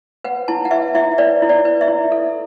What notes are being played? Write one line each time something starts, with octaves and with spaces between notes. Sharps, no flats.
B4 F#5
E4 A5
F#5
B4 E5
E4 E5
B4 D5
E4
D5
B4
E5
E4
A4